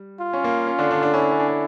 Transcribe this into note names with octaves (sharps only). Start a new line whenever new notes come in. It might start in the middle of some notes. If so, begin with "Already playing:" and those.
Already playing: G3
F4
C#4
A#3
C#4
D3 D4
D3 D4
D3 D4
C#4 E4
D4
C#4
D4
C#4